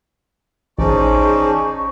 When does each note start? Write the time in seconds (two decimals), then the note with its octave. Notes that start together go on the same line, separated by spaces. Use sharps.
0.79 A1 C#4 D#4 G#4 C5 D5 A5 C#6